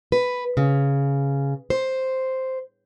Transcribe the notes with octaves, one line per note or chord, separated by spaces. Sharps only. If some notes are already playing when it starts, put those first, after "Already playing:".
B4
C#3
C5